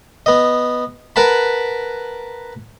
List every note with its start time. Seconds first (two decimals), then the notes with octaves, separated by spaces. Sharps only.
0.26 B3 D#5
1.16 A#4 B4 F#5 A5 B5